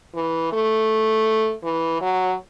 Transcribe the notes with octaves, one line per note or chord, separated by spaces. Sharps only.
E3
A3
E3
F#3